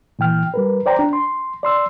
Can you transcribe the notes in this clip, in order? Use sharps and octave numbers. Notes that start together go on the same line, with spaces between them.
A#2 E3 G5 F6
G3 A#4 B4
C5 D5 G5 A#5
D4
C6
D5 C6 E6